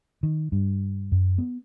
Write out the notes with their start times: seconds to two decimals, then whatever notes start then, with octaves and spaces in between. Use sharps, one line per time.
0.23 D#3
0.52 G2
1.12 F#2
1.38 B3